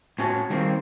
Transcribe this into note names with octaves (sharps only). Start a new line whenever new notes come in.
A2 C#4 F#4 A5
D#3 G3 G#3 A#3 C4